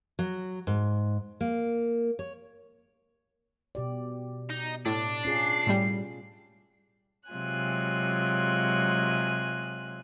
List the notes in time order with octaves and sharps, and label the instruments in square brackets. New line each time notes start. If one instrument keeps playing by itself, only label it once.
[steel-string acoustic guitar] F#3
G#2
A#3
C#5
[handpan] B2 G4 D5
[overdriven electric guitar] D#4
[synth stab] A2 [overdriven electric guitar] D4
[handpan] C#4 F4 G#4 [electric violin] C7
[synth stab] A2 G3
[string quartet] C3 F#3 G#3 F4 G#5 F#6